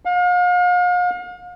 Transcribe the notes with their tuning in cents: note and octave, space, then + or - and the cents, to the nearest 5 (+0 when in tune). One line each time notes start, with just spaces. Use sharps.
F5 +40